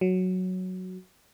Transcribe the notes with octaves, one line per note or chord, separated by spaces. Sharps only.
F#3